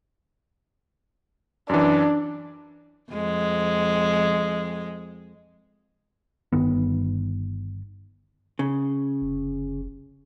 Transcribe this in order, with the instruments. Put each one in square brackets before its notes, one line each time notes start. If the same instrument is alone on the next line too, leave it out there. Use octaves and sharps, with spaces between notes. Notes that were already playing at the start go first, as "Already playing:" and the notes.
[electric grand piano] F#2 E3 [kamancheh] D4
[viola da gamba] F2 G#3
[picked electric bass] G1 D#3 B3
[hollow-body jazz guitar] C#3
[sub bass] F1